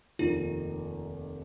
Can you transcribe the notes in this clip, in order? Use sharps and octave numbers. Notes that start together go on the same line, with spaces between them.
F1 D#2 D#3 F4